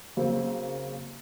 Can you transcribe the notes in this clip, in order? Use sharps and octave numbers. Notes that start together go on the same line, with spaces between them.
C#3 F#3 A#3 C4